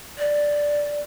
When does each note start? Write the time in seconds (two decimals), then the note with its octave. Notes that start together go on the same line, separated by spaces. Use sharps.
0.18 D5